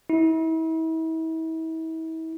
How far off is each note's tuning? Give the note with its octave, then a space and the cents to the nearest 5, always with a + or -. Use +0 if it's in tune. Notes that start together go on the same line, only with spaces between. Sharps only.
E4 -40